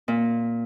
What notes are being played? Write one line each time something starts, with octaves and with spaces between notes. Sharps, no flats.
A#2